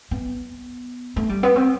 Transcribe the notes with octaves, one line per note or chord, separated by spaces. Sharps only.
B3
A3
G3
B3
C4